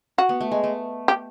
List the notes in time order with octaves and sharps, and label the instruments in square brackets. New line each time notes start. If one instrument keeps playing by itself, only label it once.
[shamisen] F#4
[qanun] B3
A3
G#3
A3
[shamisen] G4